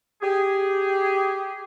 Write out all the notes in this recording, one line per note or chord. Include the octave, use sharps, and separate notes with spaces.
G4 G#4